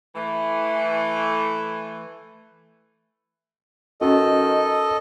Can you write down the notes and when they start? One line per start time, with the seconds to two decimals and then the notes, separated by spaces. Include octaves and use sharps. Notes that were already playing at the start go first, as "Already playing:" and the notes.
0.15 E3 A3
4.01 D#3 C#4 F#4 A4 D#5